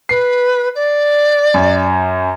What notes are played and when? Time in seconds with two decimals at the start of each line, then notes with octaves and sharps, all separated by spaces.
0.09 B4 C7
0.75 D5
1.54 F#2